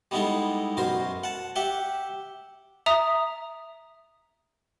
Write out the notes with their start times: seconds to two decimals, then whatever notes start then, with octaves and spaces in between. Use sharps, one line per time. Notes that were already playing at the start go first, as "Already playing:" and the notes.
0.11 G3 G#3 B3 D#4 E4 A4
0.77 F#2 B2 A#4 C5
1.24 F#5 A5
1.56 G4 E5 F#5 G5
2.86 E5 A#5 D#6